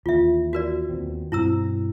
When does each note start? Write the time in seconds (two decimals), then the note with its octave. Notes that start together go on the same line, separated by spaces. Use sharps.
0.06 D#2 E3 F4 E5
0.53 F#4 A#4 D5
0.89 D#2 B3 C4
1.32 G2 B2 C4 E4 A#5 E6